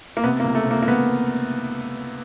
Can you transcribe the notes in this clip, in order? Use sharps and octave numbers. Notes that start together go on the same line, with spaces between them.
A#3
C3 B3
A#3
C#2
A3
C3 A#3
A#3
C#2 B3